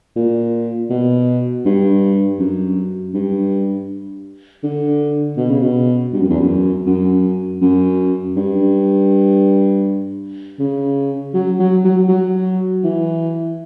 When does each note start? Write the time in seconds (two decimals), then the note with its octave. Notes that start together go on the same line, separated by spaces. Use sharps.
0.16 A#2
0.90 B2
1.65 G2
2.39 F#2
3.14 G2
4.63 D3
5.37 B2
5.50 C#3
5.62 B2
6.13 G2
6.21 F#2
6.30 E2
6.40 F#2
6.87 F#2
7.62 F#2
8.36 G2
10.59 C#3
11.34 F#3
11.60 F#3
11.85 F#3
12.09 F#3
12.84 E3